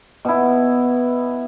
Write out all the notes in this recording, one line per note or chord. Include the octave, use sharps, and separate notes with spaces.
B2 E4